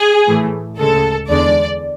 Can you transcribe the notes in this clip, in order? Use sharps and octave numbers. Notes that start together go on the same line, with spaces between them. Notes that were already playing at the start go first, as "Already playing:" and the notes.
Already playing: G#4
A2 E3 A3
D2 C#3 G#3 A4
E2 D3 G#3 D4 D5